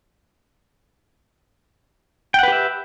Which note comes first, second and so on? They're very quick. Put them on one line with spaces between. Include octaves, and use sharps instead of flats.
G5 F#5 B4 G4 E5